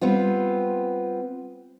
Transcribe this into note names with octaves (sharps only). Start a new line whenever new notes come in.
G3 B3 C4 F4